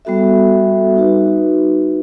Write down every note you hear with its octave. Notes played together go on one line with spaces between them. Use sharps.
G3 B3 F#4 A4 E5
D#4 F#4 B4